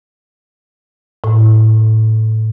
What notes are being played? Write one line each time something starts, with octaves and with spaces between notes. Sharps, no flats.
A2